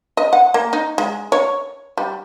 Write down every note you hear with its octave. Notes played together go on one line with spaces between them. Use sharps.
D#5
F#5
A#3
D#4
G#3
C#5
G3